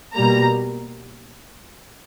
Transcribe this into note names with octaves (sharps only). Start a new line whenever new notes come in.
B2 G3 A#3 A#5